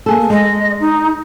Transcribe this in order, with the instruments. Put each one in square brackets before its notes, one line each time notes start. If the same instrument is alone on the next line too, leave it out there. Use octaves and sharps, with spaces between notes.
[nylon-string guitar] A#3 G#4 A4
[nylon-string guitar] G#3 [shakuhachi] D#5
[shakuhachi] D#4